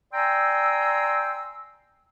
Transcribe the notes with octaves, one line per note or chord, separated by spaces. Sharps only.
D5 G5 G#5 A#5 C6 E6